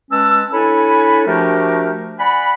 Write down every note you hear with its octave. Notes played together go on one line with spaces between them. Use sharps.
G#3 C#4 B4 A5 E6
D4 E4 A4 C#5 G#5 B5
F3 A3 D4 F#4 G4 A#4
D5 F#5 G#5 B5